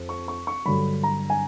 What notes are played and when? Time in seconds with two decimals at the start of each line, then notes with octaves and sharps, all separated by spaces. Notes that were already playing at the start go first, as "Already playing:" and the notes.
Already playing: F2
0.09 C#6
0.28 C#6
0.47 C#6
0.65 G2 D3 F#3 B5
1.03 A#5
1.30 G#5